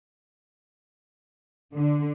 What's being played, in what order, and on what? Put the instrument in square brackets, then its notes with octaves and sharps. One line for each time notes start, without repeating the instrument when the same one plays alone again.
[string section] D3